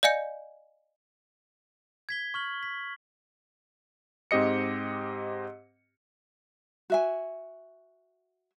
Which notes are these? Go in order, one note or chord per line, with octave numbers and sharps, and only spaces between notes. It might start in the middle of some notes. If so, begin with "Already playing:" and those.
D5 D#5 F5 G#5 G6 C#7
G#6 B6 G7
C#6 F6 F#7
B6
G#2 C4 G4 D#5 C#7
F#4 E5 G#5